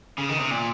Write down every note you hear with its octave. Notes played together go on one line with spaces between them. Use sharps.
C#3
D#3
C3
A#2